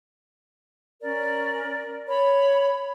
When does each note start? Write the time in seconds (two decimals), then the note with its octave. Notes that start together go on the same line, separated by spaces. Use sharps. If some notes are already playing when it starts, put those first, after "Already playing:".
1.01 C#4 A#4 D5
2.06 C#5 B5